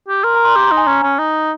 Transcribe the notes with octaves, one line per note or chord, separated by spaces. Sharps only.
G4
A#4 C6
A#5
C6
G4 C6
A#5
D#4
G#5
C#4
C#4
D#4